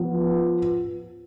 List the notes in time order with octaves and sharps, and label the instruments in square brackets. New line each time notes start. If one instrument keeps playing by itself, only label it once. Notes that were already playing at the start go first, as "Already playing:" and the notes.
Already playing: [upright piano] F3 B3